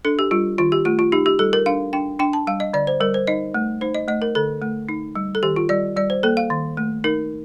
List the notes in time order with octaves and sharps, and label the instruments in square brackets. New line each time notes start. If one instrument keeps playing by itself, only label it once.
[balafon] D4 A4
G4
G3 F4
D#3 F4
G4
A3 F4
F4
D#4 G4
G4
G3 A4
A#4
D4 F5
D4 G5
D4 G5
A5
G3 F5
D#5
D3 D5
C5
G3 A#4
C5
D#4 D#5
A3
D#4 C5
D#5
A3 D#5
A#4
D3 A4
A3
D#4
G3
A4
D#3 G4
F4
G3 D5
G3 D5
C5
A#3 A4
F5
D#3
A3
D#4 A#4